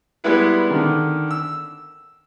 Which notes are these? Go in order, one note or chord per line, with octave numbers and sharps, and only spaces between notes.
G3 G#3 B3 E4 B4
D3 D#3
E6